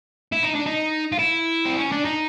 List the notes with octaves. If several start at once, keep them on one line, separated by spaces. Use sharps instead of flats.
E4
D#4
D4
D#4
F4
E4
C4
C#4
D4
D#4